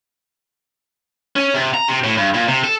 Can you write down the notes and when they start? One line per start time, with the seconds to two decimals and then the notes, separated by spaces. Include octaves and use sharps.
1.36 C#4
1.54 C3
1.74 A#5
1.88 C3
2.04 A2
2.18 G2
2.34 A#2
2.49 C3
2.64 A4